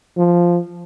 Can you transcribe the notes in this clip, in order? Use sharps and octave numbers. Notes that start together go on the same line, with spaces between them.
F3